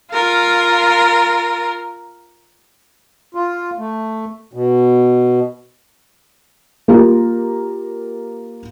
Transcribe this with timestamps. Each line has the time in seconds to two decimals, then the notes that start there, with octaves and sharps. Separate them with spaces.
0.12 F4 A#4
3.35 F4
3.78 A3
4.54 B2
6.88 A#3 F4 G4 A#4